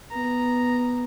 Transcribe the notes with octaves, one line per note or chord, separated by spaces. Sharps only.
B3 A#5